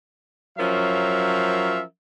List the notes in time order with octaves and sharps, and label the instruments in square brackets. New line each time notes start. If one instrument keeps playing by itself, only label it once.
[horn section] F3 F#3 C#4 A#4 E5 F5